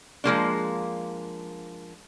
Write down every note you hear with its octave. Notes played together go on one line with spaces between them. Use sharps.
F3 G#3 A#3 D4